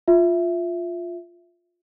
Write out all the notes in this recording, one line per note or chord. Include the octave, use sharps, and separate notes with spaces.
F4 E5